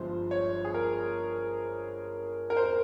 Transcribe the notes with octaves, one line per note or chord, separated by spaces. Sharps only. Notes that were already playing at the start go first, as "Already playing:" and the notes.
Already playing: G1 G2 F3 G#3 C5
C#5
G#4
A#4
A#4
C5
A#4